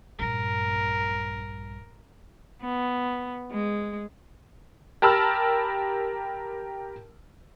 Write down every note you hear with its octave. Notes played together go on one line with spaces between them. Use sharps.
A#1 G2 A#4
B3
G#3
G4 A#4 A5 B5 E6 F6